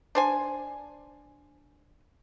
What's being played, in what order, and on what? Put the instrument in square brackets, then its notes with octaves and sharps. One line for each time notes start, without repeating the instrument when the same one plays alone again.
[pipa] D4 C5 G#5